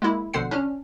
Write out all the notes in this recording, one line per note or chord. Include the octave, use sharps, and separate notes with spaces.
G#3 A#3 E4
A#1 B2 D3 C5 F#5 C7
C#4 D4 F6